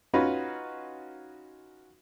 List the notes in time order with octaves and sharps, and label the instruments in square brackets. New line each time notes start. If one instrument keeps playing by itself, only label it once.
[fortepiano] C#4 D#4 F4 F#4 B4